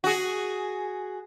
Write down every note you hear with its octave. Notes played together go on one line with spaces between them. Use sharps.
F#4 G#4